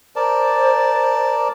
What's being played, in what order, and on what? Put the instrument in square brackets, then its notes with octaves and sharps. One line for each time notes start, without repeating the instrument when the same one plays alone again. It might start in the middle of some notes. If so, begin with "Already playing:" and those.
[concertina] A#4 D5 A5 [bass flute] C5